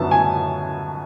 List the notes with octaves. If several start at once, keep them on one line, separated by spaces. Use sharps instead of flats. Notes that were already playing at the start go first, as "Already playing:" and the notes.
Already playing: F#2 D3 F#3 B3 E4 A5
G#5